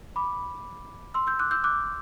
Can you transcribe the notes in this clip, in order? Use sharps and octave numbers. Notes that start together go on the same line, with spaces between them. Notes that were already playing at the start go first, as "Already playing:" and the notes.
B5 D6
C6 E6
E6 G6
D6 F#6
E6 G6
D6 F#6